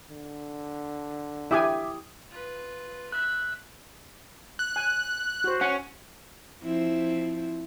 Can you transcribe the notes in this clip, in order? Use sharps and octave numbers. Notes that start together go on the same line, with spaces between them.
D3
E4 G4 E5 G#5 D6 D#6
F4 B4
E5 B5 F#6
F#6
G#5
F#4 C5
C#4 F#5
F3 C4 E4